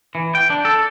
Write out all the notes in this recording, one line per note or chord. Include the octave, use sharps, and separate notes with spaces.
E3
G5
D4
A4